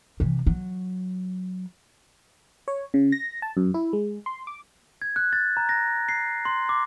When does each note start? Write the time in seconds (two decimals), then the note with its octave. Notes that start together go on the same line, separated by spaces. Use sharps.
0.20 C3 E3
0.46 F#3
2.68 C#5
2.94 C#3
3.12 A#6
3.42 A5
3.57 F#2
3.74 E4
3.93 G#3
4.26 C6
4.47 D6
5.02 G#6
5.16 F#6
5.33 A6
5.57 A#5
5.69 A#6
6.09 C7
6.45 C6
6.69 D6